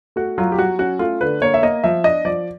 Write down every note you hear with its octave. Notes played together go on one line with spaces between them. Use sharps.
A3 F#4
F#3 F4
G4
F#3 F#4
C#4 F#4
A3 F4
D3 B4
A#3 C#5
E5
A#3 D#5
F3 E5
D4 D#5
F3 D5